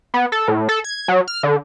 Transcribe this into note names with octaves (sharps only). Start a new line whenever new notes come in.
B3
A4
A2
A4
G#6
F#3
F6
D3